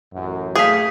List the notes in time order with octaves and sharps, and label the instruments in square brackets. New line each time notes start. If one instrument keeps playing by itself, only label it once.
[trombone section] A1 F#2
[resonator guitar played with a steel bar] A3 F5 G5 [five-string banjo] G#4 [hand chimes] D#6 B6